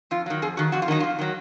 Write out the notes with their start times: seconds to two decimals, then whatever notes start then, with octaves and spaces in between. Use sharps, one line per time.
0.11 F2 F4
0.26 D#3 F#3
0.42 F2 G#4
0.57 D#3 F#3 F#4
0.72 F2 F#4
0.82 F4
0.88 D#3 F#3 D#4
1.00 F2 F4
1.19 D#3 F#3